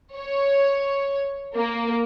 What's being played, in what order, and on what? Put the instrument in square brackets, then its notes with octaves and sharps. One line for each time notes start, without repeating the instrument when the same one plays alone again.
[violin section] C#5
A#3